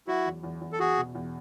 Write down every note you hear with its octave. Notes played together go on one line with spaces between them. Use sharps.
F#3 E4 F#4
E2
E2
E2
A4
E2 F#4 G#4
B2
E2